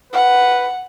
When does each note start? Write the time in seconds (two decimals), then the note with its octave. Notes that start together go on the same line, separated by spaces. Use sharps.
0.12 B4 F#5